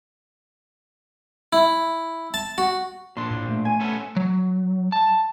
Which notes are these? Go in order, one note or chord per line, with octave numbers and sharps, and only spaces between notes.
E4
A5
F#4
A#2 D4 C6
A2
A3
G#5
B3 C#4 A4
F#3
A5